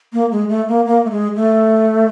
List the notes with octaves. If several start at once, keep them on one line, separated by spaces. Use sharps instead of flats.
A#3
G#3
A3
A#3
A#3
A3
G#3
A3